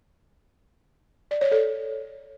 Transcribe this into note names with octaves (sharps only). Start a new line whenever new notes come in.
D5
C#5
A4